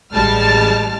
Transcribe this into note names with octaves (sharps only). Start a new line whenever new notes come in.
A1 G3 G#3 A5 F6